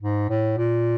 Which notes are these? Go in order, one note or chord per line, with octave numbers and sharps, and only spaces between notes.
G#2
A2
A#2